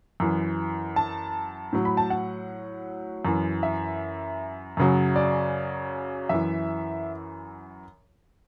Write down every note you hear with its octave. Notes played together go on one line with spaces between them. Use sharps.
F#2 E3
A5
A2 F#3
B5
A5
F#5
F#2 E3
E5
F#2 C#3 F#3
D5
F#2 E3 E5